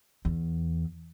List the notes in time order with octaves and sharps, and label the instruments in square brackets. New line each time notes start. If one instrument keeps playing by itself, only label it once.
[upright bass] E2